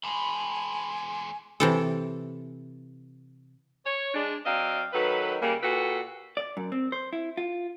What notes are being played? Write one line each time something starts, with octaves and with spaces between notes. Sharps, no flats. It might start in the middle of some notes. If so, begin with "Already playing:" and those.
E2 G#3 G#5 A5 B5
C3 E3 A4
C#5
G#3 D4
F#3 C4 D5 D#5 F5
D#3 F#3 A4 B4
C#3 G3 A#3
A#2 F#4 G4 A4 B4
D5
F#2
C4
C5
E4
F4